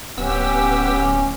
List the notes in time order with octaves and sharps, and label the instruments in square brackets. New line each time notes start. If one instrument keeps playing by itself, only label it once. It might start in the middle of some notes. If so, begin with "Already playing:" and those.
[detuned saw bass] D1 [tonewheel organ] B3 E6 [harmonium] C#4 [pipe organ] G4